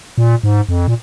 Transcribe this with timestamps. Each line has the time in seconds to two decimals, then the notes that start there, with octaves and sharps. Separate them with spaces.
0.18 A#2
0.43 G#2
0.69 F2
0.88 A#2